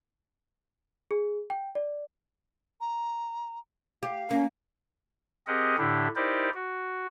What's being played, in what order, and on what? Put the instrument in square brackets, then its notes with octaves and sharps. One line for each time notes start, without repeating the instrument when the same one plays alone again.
[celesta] G#4
G5
D5
[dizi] A#5
[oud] G4 [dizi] F5
[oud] A#3 [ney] C#4
[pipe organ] C4 G4 G#4 A#4 D#5 F#5
A2 D3 D4 E4 G4
D#4 E4 G4 A#4 C5 D5
F#4